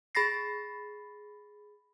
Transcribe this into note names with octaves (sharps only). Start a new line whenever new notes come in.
G#4 B5 A6 A#6 C7